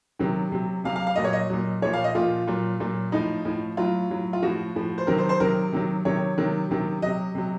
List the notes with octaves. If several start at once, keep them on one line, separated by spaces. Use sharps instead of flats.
C3 D#3 F#3
C3 F#3
C3 F#3 F5
F5
F5
A#2 F#3 D#5
C#5
D#5
A#2 F#3
A#2 F3 C#5
F5
D#5
A#2 F3 F4
A#2 F#3
A#2 F#3
A2 F3 D#4
A2 F3
A2 F#3 F4
A2 F#3
F4
A2 F3 F#4
A2 F3
C5
C3 D#3 F#3 A#4
C5
C5
C3 D#3 F#3 A#4
C3 D#3 F#3
C3 D#3 F#3 C#5
C3 D#3 F#3
C3 D#3 F#3
C3 F#3 D#5
C3 F#3